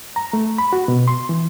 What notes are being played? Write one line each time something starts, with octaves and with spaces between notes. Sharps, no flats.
A#5
A3
B5
F#4
B2
C6
E3